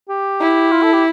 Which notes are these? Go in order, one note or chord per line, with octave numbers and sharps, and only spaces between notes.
G4
E4
F4
A4
G4